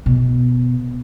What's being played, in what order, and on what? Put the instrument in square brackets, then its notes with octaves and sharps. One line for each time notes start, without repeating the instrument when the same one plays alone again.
[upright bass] B2